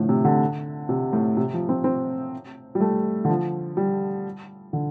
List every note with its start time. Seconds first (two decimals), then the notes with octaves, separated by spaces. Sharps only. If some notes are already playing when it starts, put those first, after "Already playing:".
Already playing: A2 D3 F3
0.09 C3
0.25 D3
0.89 C3
1.13 A2
1.37 C3
1.53 F3
1.69 C4
1.84 C4
2.75 G3
2.80 A3
3.25 D3
3.29 F3
3.77 G3
4.73 D3